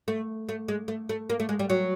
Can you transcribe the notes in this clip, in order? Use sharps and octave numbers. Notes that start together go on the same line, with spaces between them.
A3
A3
G#3
A3
A3
A#3
A3
G#3
G3
F#3